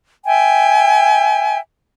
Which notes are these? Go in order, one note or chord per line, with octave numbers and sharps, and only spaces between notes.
E5 G5 G#5